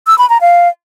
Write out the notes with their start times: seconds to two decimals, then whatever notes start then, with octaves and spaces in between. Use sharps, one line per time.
0.07 E6
0.18 B5
0.30 A#5
0.41 F5